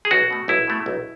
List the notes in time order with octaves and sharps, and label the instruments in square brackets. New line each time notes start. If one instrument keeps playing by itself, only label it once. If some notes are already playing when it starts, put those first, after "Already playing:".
[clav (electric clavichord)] G#4
B1 F#4
B2 A3
B1 E4
B2 A3
B1